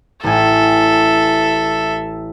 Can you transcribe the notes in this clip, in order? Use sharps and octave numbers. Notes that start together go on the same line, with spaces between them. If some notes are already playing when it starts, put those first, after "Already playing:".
A1 A2 A4 E5 G#5